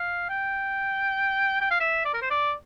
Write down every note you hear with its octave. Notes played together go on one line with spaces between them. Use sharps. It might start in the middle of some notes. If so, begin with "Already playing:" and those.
Already playing: F5
G5
G5
F5
E5
D5
A#4
C5
D5